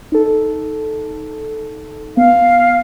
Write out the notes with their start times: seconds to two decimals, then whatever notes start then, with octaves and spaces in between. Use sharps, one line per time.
0.12 D#4 A4
2.17 B3 F5